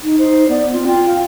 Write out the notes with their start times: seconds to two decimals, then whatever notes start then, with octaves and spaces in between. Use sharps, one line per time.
0.04 D#4
0.19 D#4 C5
0.49 B3 D5
0.73 C4 F4
0.87 F4 G5
1.08 F5